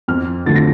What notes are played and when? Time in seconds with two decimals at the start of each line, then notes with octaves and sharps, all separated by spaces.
0.08 F2 F6
0.46 D3 F3 A3 C4 A6
0.56 A#6